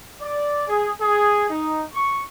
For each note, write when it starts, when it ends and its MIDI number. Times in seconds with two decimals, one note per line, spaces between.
0.22 0.64 74
0.68 0.93 68
1.01 1.50 68
1.50 1.84 63
1.94 2.21 85